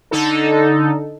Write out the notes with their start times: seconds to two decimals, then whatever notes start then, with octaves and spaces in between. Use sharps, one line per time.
0.11 D3 D#4 A4